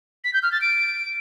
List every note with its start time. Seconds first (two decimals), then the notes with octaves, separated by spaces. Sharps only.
0.24 B6
0.34 G6
0.43 F6
0.52 A6
0.61 D7